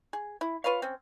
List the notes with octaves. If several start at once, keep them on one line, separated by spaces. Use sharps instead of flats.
G#4
E4
F4 B4 C#5 F5
C4 C#4